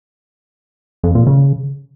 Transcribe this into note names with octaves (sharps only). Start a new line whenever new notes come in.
F2
A#2
C#3